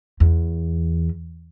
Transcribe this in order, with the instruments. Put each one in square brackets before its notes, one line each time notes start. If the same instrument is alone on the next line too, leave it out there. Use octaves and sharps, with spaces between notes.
[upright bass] E2